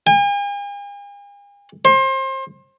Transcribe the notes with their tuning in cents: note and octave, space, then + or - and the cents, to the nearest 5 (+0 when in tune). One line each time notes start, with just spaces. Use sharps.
G#5 -45
C5 +30